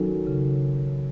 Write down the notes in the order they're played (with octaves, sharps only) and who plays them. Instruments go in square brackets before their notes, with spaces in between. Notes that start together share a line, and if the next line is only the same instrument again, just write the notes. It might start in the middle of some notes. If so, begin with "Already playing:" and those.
Already playing: [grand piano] D#3 F#3 C#4 F#4 A4
[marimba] C#3